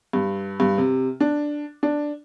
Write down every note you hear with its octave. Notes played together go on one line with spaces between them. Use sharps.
G2
G2
C3
D4
D4